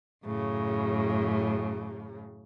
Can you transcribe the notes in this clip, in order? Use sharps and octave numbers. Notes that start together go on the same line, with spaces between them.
F#2 A2 C#3